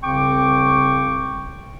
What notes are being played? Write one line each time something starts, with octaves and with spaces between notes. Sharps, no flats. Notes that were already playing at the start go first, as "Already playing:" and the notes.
C2 C#3 C4 G5 C#6 D6